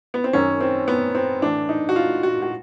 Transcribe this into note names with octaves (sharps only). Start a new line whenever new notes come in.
B3
C4
F#2 D#3 C#4
C4
B3
C4
A2 E3 D4
D#4
F#4
F4
F#4
F#4